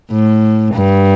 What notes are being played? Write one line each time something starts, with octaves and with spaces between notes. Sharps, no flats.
A2
G2